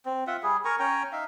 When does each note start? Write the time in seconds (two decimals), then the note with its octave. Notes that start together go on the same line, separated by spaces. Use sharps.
0.06 C4
0.27 F4 E5 F#5
0.43 G3 G#4
0.65 A#4 G#5 A#5 C#6
0.79 C#4 C#5 G5 A#5
1.12 D#4 E5 F5